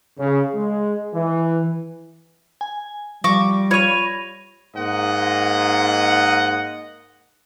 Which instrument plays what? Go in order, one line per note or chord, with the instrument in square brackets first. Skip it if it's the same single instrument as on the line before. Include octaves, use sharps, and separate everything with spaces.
[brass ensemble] C#3
G#3
E3
[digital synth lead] G#5
[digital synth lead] F3 [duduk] G3 [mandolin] C#6 D6 [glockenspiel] A#6
[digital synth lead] F4 [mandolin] C#5 C#6 [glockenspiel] B5 D#7 F7
[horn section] G#2 A#3 D#4 D#5 F#5